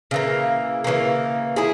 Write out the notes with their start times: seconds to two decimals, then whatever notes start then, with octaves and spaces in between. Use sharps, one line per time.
0.11 C#3 E3 A#3
0.84 C#3 E3 A#3
1.56 E4 G#4